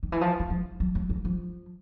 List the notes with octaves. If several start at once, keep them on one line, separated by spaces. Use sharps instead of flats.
D#3
E3
F3
E3
F3
F#3
F#3
F#3
F3